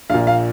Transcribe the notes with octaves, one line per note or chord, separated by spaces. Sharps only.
A#1 A#2 F5
F5